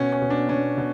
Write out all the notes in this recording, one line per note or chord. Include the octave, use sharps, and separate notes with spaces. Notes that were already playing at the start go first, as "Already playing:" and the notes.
Already playing: B2 C#4
C#4
B2
D4
B2 C#4
B2